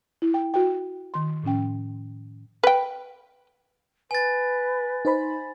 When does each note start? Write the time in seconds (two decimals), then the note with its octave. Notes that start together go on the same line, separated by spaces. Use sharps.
0.22 E4
0.34 G5
0.54 F#4 G5
1.14 D#3 C6
1.43 A2 F3 C#4 G5
2.63 B4 G5
4.11 B4 G#5 A6
5.05 D#4 C5 B5